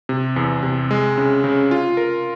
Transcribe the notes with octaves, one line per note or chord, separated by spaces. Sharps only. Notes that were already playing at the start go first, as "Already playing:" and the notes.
C3
E2
C3
G#3
C#3
C#3
F4
A#4